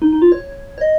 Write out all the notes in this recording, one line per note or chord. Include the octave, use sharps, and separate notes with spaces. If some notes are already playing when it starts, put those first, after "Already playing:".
D#4
D#4
F4
C#5
C#5
D#5